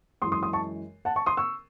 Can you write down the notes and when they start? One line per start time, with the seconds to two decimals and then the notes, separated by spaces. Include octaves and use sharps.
0.22 F#2 E3 G#3 C6 D#6
0.32 C6 D#6
0.43 C6 D#6
0.53 A5 C#6
1.05 F#5 A5
1.16 A5 C#6
1.26 C6 D#6
1.37 C#6 E6